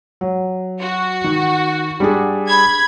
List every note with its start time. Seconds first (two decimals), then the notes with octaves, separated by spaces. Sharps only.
0.21 F#3
0.80 F#4
1.24 D#3
2.00 G3 D4 G#4
2.48 B5 G#6